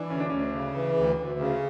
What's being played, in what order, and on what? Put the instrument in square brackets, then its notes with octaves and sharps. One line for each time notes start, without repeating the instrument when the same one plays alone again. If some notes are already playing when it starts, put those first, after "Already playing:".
Already playing: [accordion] E3 [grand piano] D4 E4
[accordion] D2 [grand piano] C#4
[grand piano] D4
[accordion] D2 [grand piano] C#4
[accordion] C#3
E3
D2
D2
C#3